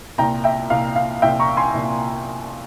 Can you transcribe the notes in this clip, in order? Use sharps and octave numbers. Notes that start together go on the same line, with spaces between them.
C2 A#2 G5 A#5
E5 G5
C2 A#2 F5
F5
C2 A#2 E5 G5
A#5 C#6
G#5 C6
C2 A#2